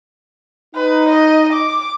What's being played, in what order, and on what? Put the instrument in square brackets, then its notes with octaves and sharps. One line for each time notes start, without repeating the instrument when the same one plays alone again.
[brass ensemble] D#4 [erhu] B4
[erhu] D#5
D6